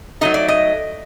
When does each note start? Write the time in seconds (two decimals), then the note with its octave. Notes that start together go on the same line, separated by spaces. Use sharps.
0.21 F#3 A3 D#4 D#5
0.34 D5
0.48 D#5